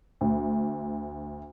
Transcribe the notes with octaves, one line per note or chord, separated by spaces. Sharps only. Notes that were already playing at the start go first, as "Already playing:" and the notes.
D2